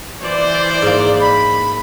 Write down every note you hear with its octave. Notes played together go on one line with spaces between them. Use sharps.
E3 C5 D5
G#2 A#3
B5